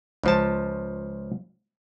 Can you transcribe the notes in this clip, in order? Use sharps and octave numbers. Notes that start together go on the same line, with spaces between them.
C#2 F3 A5